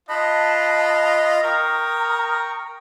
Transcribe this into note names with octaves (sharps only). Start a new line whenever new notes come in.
F4 D#5 A5 B5 F#6
A#4 G5 A#5 C#6 D#6